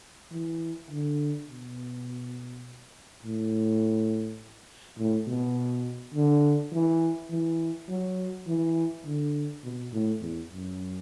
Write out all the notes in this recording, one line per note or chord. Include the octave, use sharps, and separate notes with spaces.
E3
D3
B2
A2
A2
B2
D3
E3
E3
F#3
E3
D3
B2
A2
E2
F#2